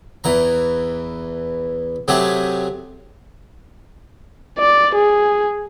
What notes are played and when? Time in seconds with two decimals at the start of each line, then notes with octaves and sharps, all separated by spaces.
0.24 E2 E3 A#5
2.08 C3 F#3 A3 G4 G#4
4.59 D5
4.95 G#4